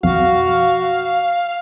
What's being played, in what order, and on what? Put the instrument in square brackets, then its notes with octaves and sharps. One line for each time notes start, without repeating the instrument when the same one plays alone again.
[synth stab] B1 F2 [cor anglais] F#4 [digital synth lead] F5